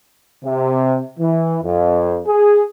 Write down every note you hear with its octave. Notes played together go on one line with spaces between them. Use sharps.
C3
E3
F2
G#4